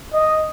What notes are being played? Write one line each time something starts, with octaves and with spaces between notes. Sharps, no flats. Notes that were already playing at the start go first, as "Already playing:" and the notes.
D#5